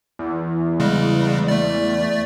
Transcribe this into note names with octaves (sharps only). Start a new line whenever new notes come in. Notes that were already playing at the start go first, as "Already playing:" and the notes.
E2
C#3 G3 G#3
A3 D5